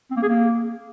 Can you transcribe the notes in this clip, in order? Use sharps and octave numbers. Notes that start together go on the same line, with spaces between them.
C4
A#3
G#4
A#3